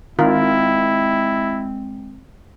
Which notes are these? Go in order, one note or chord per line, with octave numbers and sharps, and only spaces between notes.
D#3 G#3 C4 E4 F4 A#4